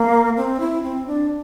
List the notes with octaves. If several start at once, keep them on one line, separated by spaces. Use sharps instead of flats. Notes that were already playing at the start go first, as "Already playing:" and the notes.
Already playing: A#3
C4
E4
C4
D4